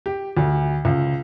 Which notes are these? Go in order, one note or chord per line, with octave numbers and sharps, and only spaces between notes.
G4
D2
C#2